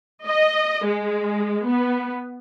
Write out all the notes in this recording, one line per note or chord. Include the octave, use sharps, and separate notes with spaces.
D#5
G#3
B3